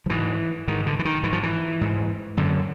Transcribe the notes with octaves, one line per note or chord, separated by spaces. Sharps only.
F3
G#2 E3
G#2 D#3
D3
E3
D#3
G#2 E3
F3
E3
G#2
F#2 D3